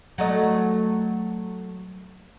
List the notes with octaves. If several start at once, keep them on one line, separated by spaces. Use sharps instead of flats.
F#3 A3 D#5